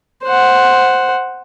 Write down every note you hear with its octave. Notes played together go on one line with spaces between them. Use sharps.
C5 F#5